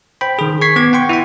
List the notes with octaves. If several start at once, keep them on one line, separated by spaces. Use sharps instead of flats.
C5 G5 B5
D#3 G#4
C#6 G#6 B6 C7
B3 D6 G#6
F#5 G5 C6 C#6
E4 E5 G5